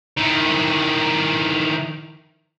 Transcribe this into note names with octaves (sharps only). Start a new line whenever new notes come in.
D#3 E3